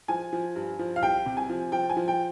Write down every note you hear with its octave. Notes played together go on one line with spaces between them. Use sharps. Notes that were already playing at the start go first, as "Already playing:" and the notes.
F3 G#5
F3
G2
F3
F5
C2 G5
C3
G#5
F3
F3 G5
G#5
F3
G5